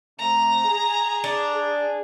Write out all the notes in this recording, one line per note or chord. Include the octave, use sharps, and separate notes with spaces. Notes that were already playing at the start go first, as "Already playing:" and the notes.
C3 A3 A#5
G#4
D4
G#4